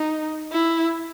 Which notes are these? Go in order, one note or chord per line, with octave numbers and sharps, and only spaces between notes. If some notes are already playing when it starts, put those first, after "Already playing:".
Already playing: D#4
E4